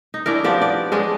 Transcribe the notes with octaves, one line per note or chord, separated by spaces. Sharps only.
D#4
C#4 D4 E4 A#4
F3 B3 G4 D5
D5
G#3 C#4 D4